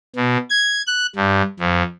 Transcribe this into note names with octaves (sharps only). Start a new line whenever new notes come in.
B2
G#6
F#6
G2
F2